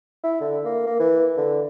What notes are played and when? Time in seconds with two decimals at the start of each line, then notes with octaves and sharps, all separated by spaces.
0.24 E4
0.41 D3
0.65 A#3
0.86 A#3
0.99 E3
1.37 D3